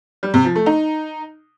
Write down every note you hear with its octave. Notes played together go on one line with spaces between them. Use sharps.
G3
C3
F3
A3
D#4